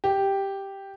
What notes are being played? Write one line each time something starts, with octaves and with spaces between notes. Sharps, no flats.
G4